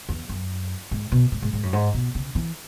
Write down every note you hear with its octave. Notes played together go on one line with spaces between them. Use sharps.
E2
F#2
G#2
B2
G#2
G#2
G#2
F#2
G#2
B2
C#3
E3